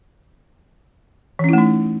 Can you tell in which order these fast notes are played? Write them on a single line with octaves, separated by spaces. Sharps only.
E3 C#4 E4 A3 D#4